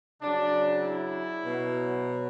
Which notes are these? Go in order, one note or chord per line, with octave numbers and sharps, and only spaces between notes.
C#3 F#3 D4
E4
B2 F#3